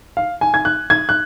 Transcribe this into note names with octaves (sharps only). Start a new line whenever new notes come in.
F5
G#5
G#6
F#6
G#6
F#6